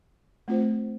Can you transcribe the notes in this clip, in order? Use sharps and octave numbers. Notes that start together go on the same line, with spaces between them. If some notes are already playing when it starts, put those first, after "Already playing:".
A3 C4 F4 C5